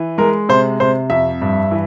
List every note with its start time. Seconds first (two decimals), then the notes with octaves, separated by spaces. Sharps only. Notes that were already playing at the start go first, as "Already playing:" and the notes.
Already playing: E3
0.18 G#3 A#4
0.49 C3 C5
0.80 C3 C5
1.10 F2 E5
1.42 G2
1.71 E3